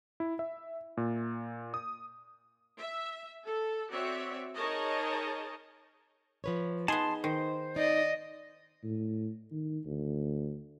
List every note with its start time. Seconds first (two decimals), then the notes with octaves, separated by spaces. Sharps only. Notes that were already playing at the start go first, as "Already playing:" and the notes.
0.20 E4
0.39 E5
0.97 A#2
1.74 D#6
2.78 E5
3.45 A4
3.91 C4 F#4 C#5 D5 E5
4.55 D#4 G#4 A#4 C#5 D#5 A5
6.44 F3 B4 C#5
6.88 B3 D#4 G#4 A5 C6
7.24 D#3 C5
7.76 D#4 D5 D#5
8.83 A2
9.51 D#3
9.86 D2